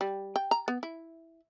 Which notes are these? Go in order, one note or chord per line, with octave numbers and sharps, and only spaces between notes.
G3
G5
A#5
B3
E4